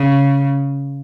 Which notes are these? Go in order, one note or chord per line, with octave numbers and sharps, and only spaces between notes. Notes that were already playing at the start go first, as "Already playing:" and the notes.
Already playing: C#3